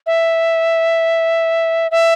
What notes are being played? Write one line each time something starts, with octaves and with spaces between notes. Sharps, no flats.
E5
E5